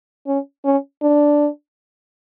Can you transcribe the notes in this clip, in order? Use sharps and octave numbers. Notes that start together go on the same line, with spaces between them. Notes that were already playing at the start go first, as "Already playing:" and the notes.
C#4
C#4
D4